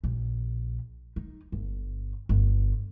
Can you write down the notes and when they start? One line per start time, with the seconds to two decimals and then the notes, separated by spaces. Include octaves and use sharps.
0.04 A#1
1.16 D#4
1.52 G1
2.29 G1